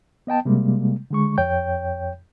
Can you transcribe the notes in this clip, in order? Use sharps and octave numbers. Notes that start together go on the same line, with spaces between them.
B3 D#5 G5 A5
C3 G3 G#3 A#3
D3 G#3 C#6
F2 C#5 G5 G6